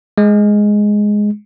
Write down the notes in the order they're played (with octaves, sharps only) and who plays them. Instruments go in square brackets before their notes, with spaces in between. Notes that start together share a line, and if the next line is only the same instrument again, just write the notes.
[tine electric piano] G#3